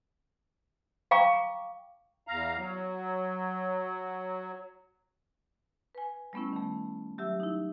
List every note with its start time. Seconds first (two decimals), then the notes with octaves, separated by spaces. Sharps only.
1.11 F5 G5 A#5 C#6 D6
2.27 E2 F5 A#5
2.57 F#3
5.95 B4 G#5
6.33 G3 A3 B3 C#4 E4
6.53 D#3 A3
7.18 F#3 G4 E5 E6
7.40 D#4 E4